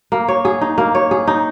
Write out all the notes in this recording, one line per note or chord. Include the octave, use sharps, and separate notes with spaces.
A#3
C#5
G#4
D#4
A#3
C#5
G#4
D#4